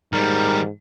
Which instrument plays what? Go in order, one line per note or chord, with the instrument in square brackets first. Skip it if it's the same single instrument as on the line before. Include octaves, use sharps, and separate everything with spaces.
[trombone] G#2 [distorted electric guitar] D#3 G3 [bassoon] A#4